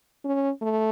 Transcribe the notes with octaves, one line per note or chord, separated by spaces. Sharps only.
C#4
A3